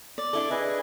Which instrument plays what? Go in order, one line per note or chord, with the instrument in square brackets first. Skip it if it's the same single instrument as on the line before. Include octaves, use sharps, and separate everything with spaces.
[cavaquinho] D5
[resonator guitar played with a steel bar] D4 E4 A4
[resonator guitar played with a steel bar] E4 [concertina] G#4 B4 D#5